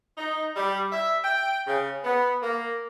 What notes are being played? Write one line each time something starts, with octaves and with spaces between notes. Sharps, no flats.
D#4
G3
E5
G5
C#3
B3
A#3